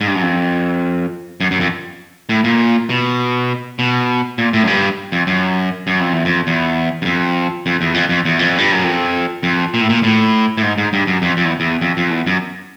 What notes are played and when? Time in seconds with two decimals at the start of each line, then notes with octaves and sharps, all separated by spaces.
0.01 G#2
0.07 G2
0.15 F#2
0.22 F2
1.40 F#2
1.51 F#2
1.60 F2
2.29 A2
2.44 A#2
2.90 B2
3.79 B2
4.38 A#2
4.53 A2
4.63 F#2
4.67 G2
5.12 F2
5.27 F#2
5.87 F#2
6.00 F2
6.13 E2
6.25 F2
6.47 E2
7.02 F#2
7.05 F2
7.66 F2
7.81 E2
7.94 F2
8.09 F2
8.25 E2
8.39 F2
8.58 G2
8.72 F#2
8.84 F2
9.43 F2
9.74 A#2
9.81 A2
9.89 A#2
10.03 A2
10.57 A2
10.62 G#2
10.78 G#2
10.93 G2
11.07 F#2
11.22 F2
11.37 F2
11.45 E2
11.60 E2
11.81 F2
11.97 F2
12.11 E2
12.27 F#2